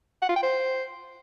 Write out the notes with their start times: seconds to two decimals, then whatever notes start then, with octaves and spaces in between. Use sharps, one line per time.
0.22 F#5
0.29 F4
0.36 G5
0.43 C5